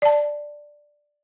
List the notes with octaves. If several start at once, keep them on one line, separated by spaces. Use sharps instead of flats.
D5 A5